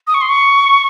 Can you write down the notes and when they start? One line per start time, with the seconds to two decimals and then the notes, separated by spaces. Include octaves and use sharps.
0.07 D#6
0.14 C#6
0.21 C6
0.29 C#6